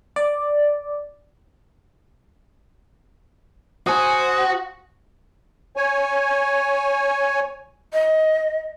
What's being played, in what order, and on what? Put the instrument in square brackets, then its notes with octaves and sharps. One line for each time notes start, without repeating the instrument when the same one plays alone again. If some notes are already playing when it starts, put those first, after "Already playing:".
[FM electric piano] D5
[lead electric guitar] F#4 [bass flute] C5 [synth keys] G#5 D#6
[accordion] C#5 G#5
[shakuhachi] D#5